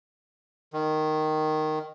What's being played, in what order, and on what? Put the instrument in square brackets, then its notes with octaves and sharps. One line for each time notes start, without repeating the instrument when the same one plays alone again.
[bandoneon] D#3